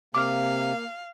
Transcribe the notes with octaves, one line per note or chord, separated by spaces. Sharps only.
C3 A#3 F5 D6 F6